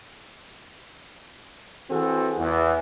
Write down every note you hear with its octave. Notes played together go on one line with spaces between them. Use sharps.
E3 C4 F#4 G#4 A4
E2